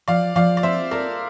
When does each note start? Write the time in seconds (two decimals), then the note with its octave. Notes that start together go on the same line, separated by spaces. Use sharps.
0.08 F3 D5 F5
0.36 F3 D5 F5
0.57 D5
0.63 C4 C5 E5
0.91 A4 A#4 D5